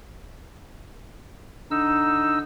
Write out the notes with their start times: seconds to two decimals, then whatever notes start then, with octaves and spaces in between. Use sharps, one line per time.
1.71 D3 D#4 E6